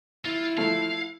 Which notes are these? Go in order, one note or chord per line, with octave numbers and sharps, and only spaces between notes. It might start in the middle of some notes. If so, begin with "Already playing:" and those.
E4 F4
F3 A3 F5